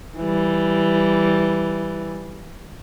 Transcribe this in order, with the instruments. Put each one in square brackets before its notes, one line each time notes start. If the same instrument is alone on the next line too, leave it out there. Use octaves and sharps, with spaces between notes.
[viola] E3 G3